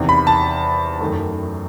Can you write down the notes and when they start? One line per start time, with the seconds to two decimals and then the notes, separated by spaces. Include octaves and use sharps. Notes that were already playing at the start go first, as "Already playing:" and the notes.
Already playing: E2 C3 D#3
0.09 B5
0.27 A5
1.01 F#2 D#3 A3